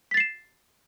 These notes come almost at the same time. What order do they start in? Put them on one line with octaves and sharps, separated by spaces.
B6 A6 C7 E7